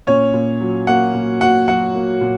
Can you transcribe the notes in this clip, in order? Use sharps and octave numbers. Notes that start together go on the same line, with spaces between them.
A#2 C#4 C#5
A#2
F#3
A#3 F#4 F#5
A#2
A#2 F#4 F#5
F#3 F#4 F#5
A#3
A#2